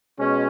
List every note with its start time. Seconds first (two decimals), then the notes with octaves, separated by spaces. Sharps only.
0.18 B2 G#3 C#4